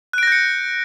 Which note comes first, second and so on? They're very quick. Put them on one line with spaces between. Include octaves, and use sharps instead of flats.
F#6 D7 A#6 G6 C#7